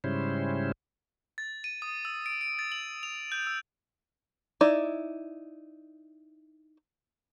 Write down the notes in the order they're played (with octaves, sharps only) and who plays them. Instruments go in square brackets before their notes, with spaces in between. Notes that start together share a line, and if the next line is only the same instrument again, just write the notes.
[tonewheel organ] G#2 C#3 G3 C#4 E4 C5
[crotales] A6
D#7
D#6
E6
D7
D7
A6
F#7
F7
G6
E6
[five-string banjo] D#4 E4 D5